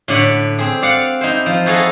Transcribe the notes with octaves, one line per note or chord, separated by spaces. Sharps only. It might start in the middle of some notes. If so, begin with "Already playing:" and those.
A2 D3 D5 F#5 B5
C4 G#4
D5 F5 F#5
D#4 E4 C5
F3
E4 F#4 G#4 A4 D#5 F5